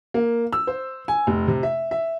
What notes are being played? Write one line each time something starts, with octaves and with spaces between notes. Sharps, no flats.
A#3
E6
C5
G#5
F1
C3
E5
E5